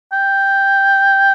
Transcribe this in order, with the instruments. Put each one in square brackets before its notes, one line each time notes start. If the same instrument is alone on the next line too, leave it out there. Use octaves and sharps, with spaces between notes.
[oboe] G5